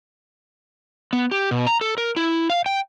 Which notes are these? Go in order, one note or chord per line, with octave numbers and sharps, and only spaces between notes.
B3
G4
B2
A#5
A4
A#4
E4
F5
G5